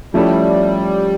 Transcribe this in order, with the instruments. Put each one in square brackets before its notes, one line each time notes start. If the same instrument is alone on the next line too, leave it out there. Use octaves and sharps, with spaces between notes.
[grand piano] F3 A3 C#4 E4 A4 [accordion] G3